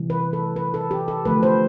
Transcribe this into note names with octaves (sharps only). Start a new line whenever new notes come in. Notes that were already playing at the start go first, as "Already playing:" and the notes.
Already playing: C3 E3 G3
B4
A4
B4
A4
G4
A4
D3 F3 A3 B4
C5